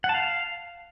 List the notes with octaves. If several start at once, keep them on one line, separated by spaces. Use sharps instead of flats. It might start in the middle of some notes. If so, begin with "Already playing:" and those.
F#5
A5
F5